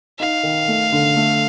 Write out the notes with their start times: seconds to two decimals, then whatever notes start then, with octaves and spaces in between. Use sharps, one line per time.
0.19 D#4 F5
0.43 D#3
0.68 A3
0.92 D3
1.16 A3